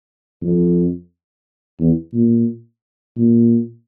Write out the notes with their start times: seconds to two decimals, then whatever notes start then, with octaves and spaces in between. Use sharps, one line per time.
0.42 F2
1.80 E2
2.14 A#2
3.16 A#2